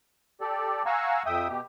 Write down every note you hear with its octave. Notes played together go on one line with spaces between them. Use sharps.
G4 A4 D5
F5 F#5 G#5 A#5 C#6 E6
F2 E5 G5 D#6
B2 G4